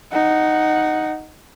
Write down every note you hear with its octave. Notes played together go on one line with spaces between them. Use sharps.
D#4 F#5